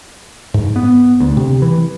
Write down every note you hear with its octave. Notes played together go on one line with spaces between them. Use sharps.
G#2
B3
D2
C3
E3